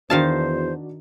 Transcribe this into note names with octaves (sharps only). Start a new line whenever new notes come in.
E2 D#3 D4 F#4 C5 F5 A5